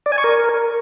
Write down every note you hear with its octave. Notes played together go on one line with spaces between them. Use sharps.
D5
G#5
C#6
A#4